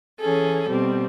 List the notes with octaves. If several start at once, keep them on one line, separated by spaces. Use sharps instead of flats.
E3 C#4 G#4 A4
B2 G3 C4